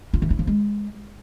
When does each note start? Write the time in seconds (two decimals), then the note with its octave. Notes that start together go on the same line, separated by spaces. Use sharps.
0.13 F4
0.22 E3
0.30 E4
0.39 F3
0.47 G#3